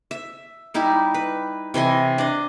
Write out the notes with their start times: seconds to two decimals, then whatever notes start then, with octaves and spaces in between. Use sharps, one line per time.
0.11 E5
0.74 G3 D#4 E4 G4
1.14 B4
1.74 C3 E3 D#5 G#5
2.18 D4 D#5